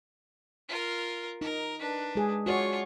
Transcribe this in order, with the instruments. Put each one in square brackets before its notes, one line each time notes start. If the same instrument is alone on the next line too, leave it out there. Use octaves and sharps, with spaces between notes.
[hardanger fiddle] F4 A#4
[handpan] D#4 [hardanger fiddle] A#4
[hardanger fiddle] D4 B4
[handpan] G#3 G#4
[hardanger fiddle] F4 C#6 [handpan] F#4 C#5 D5